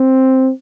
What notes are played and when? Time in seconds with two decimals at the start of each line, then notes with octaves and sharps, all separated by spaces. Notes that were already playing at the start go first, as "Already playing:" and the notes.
Already playing: C4